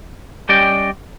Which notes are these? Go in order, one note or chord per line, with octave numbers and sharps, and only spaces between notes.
G3 C#4 G4 D5 D#5 G5